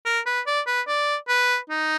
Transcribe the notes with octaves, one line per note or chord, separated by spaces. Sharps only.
A#4
B4
D5
B4
D5
B4
D#4